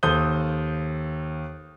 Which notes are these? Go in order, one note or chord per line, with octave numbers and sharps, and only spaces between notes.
D#2 A4 C5 D#6 G6 G7